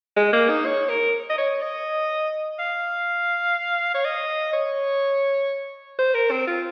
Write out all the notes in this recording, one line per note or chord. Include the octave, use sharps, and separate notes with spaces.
G#3
A#3
D#4
C#5
A#4
D#5
C#5
D#5
F5
C#5
D#5
C#5
C5
A#4
C4
F4